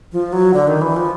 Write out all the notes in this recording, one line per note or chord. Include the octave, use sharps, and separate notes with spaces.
F3
F#3
D3
D#3
E3
F3